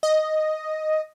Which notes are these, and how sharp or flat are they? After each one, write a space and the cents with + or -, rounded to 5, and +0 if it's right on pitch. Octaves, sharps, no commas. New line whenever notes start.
D#5 +0